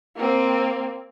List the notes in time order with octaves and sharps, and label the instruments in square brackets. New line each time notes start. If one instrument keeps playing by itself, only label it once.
[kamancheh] A#3 C4